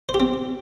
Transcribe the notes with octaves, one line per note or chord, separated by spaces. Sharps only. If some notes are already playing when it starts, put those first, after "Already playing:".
C5
G4
C4